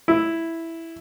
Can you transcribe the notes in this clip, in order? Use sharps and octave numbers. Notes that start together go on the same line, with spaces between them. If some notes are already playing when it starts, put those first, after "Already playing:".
E4